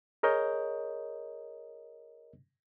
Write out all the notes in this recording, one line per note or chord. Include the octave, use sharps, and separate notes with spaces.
G#4 A#4 C#5 D#5 G6